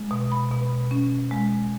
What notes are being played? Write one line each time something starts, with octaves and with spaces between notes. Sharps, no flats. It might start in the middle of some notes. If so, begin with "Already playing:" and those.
Already playing: G#3
B2
B5
B2
C#4
G#3